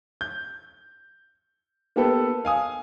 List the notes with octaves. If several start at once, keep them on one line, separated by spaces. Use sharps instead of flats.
G6
A#3 B3 G4 A4 B4
F5 G#5 D#6